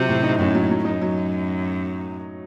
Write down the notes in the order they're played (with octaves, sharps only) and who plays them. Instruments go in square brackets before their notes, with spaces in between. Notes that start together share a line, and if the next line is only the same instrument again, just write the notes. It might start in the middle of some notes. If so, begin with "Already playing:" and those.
Already playing: [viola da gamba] C3 [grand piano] F#3 F4
[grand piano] A2
D#4
[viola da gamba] F#2 [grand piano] A2
[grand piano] F#3
F#3
[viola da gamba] F#2 [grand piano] D#4
[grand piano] F#3